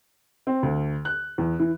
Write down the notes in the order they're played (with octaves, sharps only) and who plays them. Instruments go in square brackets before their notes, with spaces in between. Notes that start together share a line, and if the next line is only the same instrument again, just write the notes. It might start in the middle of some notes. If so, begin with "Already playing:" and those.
[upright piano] C4
D2
F#6
E2
E3